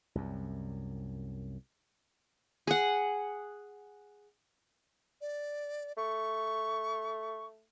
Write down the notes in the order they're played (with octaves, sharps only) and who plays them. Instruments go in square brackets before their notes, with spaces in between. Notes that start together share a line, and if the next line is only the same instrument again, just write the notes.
[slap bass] C2 F#2
[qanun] G#4 F#5
[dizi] D5
[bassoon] A3 [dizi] C#6